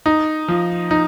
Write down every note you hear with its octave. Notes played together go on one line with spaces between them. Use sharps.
D#4
F3
D#4